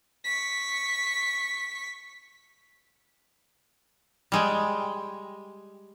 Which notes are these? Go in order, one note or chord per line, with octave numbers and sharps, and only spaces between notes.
C#6 B6
G3 G#3 G5